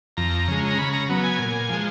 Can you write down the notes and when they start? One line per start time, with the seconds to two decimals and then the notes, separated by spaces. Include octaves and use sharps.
0.17 F2 A#5
0.48 C#3 G#3
0.69 A#5
0.78 C#3 B5
0.93 A#5
1.09 F#3 B3
1.23 G#5
1.39 A#2
1.69 F3 G#3